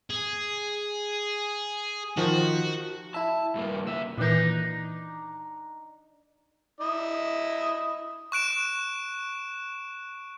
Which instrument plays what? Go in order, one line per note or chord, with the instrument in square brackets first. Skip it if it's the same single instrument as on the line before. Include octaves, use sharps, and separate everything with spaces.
[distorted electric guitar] G#4
[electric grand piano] D#3 F3 [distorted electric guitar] F#4
[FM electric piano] E4 E5 [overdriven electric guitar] A5
[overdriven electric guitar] G2 A#3
[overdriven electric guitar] C#3 E5 [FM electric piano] E6
[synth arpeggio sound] A#2 D#3 E3 [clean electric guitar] D4 D#4
[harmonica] E4 D#5
[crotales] C#6 F#6 D7 E7